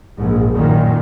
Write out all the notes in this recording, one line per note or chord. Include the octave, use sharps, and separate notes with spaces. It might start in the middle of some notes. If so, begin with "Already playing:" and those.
A#1 G#2
F#2 A#2 D#3